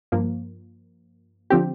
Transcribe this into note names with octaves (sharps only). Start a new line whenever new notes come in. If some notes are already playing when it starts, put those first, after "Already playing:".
G2 F3 A#3
D3 F3 C4 G4